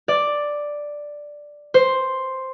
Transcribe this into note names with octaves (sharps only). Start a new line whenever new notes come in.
D5
C5